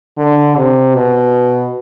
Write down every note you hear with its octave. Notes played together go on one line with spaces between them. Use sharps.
D3
C3
B2